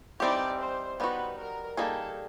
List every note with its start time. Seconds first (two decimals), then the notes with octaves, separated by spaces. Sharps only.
0.20 E3 G3 C4 D#4 G4 D5
0.60 C5
1.00 G3 B3 D#4 F#4 B4
1.39 A#4
1.77 G3 A#3 D#4 G#4 A4